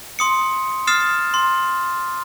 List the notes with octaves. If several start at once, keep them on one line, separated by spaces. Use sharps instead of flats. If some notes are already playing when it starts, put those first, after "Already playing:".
C6 D#6 C#7
D#6 F6 A6 C7 E7
C6